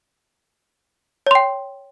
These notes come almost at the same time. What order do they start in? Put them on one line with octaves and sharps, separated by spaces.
C#5 C6 G5